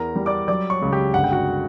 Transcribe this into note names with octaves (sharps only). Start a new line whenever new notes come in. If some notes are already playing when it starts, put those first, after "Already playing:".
Already playing: E2 A#4 A#5
G3
D5 D6
F#3 D5 D6
C#5 C#6
C#2
G4 G5
G1 F#5
G5
F#4 F#5